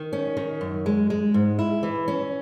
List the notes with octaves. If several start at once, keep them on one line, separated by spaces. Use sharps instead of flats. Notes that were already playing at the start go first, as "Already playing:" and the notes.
Already playing: D#3
C#4
D#3
F#2
G#3
G#3
G#2
E4
E3
C#4